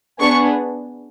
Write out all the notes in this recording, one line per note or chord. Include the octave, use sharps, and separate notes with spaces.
B3 D4 G#4 C#6